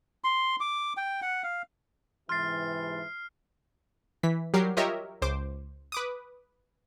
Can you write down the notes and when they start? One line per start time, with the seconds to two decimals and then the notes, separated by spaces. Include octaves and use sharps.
0.24 C6
0.60 D6
0.97 G5
1.22 F#5
1.43 F5
2.29 G#2 C3 E3 C6 F6 A6 C7
4.23 E3 B6
4.54 F#3 G3 G4 A#4 C7
4.77 F4 G4 A#4 C#5 D#5 E5
5.22 C#2 C5 D6
5.92 B4 D6 D#6